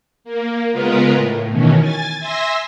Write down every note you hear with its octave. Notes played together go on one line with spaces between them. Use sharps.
A#3
C#3 G#3 B3 F4 A#4 B4
A2
B2 D#3 E3 C#4
G#5 A6
E5 G#5 C6 E6 A#6